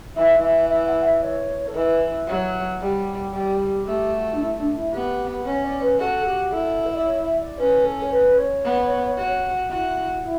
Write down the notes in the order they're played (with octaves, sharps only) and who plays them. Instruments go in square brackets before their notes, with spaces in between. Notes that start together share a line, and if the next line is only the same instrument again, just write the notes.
[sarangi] E3 [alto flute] E5
[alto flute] E5
E5
F#5
E5
C#5
A4
[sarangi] E3 [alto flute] B4
[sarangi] F#3
G3
G3
[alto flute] G4
[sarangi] A3 [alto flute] G4
[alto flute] F#4
D4
E4
D4
E4
[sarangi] B3 [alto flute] G4
[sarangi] C#4 [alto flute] C#5
[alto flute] D5
B4
[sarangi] F#4 [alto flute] A4
[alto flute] G4
[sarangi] E4 [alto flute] A4
[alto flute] E5
D5
C#5
E5
D5
[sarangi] C#4 [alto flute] B4
[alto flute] A4
C#5
B4
C#5
[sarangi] B3
F#4
[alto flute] E4 [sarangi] F#4
[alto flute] E4